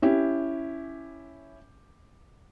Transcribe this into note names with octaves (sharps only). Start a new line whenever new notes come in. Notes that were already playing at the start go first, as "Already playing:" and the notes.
C#4 E4 G4